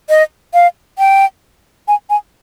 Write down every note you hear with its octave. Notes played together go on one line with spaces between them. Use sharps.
D#5
F5
G5
G#5
G#5